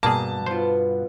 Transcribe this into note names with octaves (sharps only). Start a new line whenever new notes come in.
G2 B2 A#3 G#4 A5
B3 F4 C5